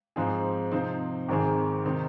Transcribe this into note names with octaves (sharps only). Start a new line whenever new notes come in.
G#2 F3 C4 D#4 G#4
C3 F3 C4 D#4 C5
G#1 G#2 D#3 C4 G#4
C3 D#3 C4 D#4